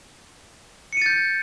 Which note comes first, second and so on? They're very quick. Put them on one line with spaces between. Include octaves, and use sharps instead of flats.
C#7 D#7 A6 G6